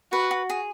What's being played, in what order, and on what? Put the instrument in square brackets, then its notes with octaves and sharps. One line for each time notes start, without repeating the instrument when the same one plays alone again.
[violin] F#4 [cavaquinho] B4
[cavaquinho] F#4
G#4